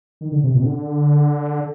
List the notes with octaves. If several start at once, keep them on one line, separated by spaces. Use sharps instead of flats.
D#3
D3
C3
A#2
C3
D3